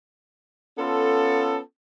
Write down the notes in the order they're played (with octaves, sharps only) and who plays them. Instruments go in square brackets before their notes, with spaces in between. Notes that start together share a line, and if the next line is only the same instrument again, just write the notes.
[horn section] B3 C#4 F4 A4